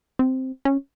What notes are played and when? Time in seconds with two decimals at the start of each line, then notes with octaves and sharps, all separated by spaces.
0.19 C4
0.65 C#4